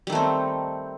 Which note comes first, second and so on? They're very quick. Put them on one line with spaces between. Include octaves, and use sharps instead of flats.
G3 D#3 A3 C4